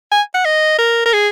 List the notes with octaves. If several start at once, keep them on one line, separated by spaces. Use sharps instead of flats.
G#5
F#5
D#5
A#4
A#4
G#4